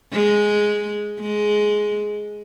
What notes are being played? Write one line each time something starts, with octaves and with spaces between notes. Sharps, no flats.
G#3
G#3